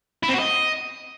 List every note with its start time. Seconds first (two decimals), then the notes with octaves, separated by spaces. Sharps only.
0.23 E4
0.28 C4
0.34 F#4
0.39 D#5